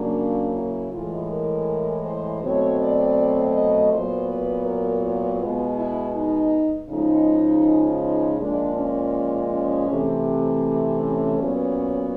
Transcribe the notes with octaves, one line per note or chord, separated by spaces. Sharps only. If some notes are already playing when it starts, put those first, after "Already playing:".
Already playing: C#3 F#3 A#3 D4
E4
A2 E3 G#3 F4
A#4
C5
B2 F#3 A3 C4 C#5
D5
D#5
A#2 F#3 B3 C5
B4
A#4
F4
B2 G#3 B3
E4
D#4
C#3 F3 G#3 D#4
D#4
A#2 F3 G#3 D4
C#4
C#4
C3 E3 A3 C4
C4
C#4
A#2 F#3 B3